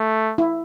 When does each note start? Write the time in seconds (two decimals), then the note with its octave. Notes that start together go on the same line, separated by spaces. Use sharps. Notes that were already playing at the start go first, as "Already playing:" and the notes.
Already playing: A3
0.38 E4